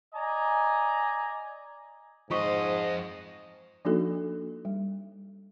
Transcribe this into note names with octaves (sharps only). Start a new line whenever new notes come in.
D5 D#5 G#5 A#5
F2 G#2 F4 C5 D#5 C#6
F3 A#3 D4 D#4 F#4 A4
G3